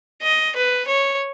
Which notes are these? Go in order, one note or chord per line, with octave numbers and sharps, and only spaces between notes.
D#5
B4
C#5